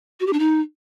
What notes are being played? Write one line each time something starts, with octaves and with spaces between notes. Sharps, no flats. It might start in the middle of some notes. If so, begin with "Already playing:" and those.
F#4
G4
D4
D#4